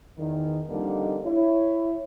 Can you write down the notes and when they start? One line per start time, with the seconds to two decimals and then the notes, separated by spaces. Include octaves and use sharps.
0.17 E2 D#3
0.68 F2 D3 G3 A#3 D4 D#4
1.25 E4 C#5